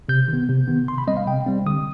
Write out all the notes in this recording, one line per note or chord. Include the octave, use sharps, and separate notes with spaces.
C3 G6
D#3
B3
C3
D#3 B3
C3 C6
B5
G3 C4 D#5
F5
C3 G5
G3 C4
D3 D#6